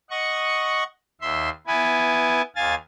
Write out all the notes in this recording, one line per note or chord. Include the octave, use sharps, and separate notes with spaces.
D#5 F#5 C#6
D#2 E5 C6
B3 E4 B4 G#5
D#2 F5 G#5 A6